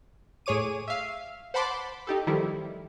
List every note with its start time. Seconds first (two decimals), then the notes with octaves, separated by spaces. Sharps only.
0.46 A2 G#4 C#5 D6 D#7
0.88 E5 F5
1.54 C5 F#5 A5 B5 C6 D6
2.07 D#4 G4 A4
2.27 D#3 F3 G3 A3 E4